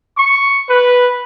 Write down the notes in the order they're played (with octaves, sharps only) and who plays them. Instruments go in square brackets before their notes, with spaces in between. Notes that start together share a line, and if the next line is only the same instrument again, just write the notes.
[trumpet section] C#6
B4